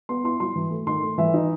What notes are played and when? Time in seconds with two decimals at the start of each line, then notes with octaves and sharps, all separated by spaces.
0.09 B3 C6
0.24 E4 C6
0.40 F#3 C6
0.56 E3
0.71 A3
0.87 D#3 C6
1.03 A3
1.18 E3 E5
1.34 D#4